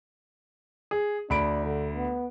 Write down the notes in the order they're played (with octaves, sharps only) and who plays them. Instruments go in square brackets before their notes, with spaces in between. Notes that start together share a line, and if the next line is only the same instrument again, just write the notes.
[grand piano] G#4
[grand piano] D2 B5 D7 [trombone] D4
[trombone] D3
B3